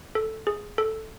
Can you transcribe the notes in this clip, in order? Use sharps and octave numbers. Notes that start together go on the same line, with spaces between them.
A4
G#4
A4